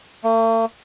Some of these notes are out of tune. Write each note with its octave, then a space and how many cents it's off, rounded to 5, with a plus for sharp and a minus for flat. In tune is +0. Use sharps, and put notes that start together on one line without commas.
A3 +45